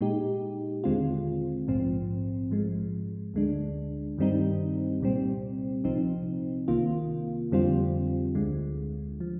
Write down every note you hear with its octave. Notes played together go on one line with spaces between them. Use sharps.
A#2 G#3 D#4 G4
D#2 D3 G#3 C4 F4
A#1 G#2 F3 C4
G#2 F3 G#3
D2 D3 G#3 D4
G2 D#3 G3 C4 D#4
C2 A#2 G3 C4
C2 C3 F3 C4 D#4
C2 C3 D#3 A#3 F4
F2 D3 G3 C4 F4
D2 D3 G#3
F3